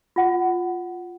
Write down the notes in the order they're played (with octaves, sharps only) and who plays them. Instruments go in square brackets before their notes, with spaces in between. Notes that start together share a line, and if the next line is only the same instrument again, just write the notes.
[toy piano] F4 F#5